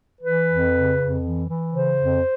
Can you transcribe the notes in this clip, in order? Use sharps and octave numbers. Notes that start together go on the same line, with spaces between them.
E3 B4
F2
C#3
F2
E3
E3
C#3 C5
F2